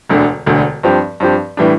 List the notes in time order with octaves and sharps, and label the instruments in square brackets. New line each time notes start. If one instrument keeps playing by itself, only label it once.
[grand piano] E1 D2 D3
E1 D2 D3
G2 F3 C4 G4
G2 F3 C4 G4
A2 E3 G3 D4